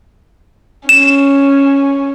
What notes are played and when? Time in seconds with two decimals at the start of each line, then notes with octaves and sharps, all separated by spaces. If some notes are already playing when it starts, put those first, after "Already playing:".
0.89 C#4 E7